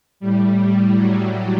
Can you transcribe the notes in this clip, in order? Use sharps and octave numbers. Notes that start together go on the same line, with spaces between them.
A2 G3
G3
F#3